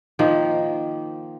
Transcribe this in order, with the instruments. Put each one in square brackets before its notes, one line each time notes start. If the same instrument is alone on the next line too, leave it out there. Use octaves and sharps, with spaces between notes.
[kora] D#3 F3 A#3